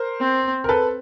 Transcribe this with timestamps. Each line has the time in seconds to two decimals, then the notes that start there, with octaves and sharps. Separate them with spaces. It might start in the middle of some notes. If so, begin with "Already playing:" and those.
Already playing: A#4 C5
0.20 C4
0.64 A#4
0.69 A4 B4